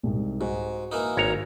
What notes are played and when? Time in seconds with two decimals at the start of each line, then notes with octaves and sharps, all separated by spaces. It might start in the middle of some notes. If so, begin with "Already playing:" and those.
0.03 C2 G#2
0.41 G#2 F#4
0.92 E3 A#3 D#4
1.17 G#1 C#5 A#5